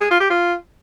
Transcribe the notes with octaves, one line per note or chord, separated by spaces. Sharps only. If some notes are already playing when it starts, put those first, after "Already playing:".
G#4
F4
G4
F4